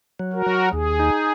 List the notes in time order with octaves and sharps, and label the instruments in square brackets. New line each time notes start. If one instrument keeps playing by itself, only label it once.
[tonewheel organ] F#3
[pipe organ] F#4 A#4
[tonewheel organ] F#3
[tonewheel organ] D#2 [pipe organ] G#4
[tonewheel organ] D#4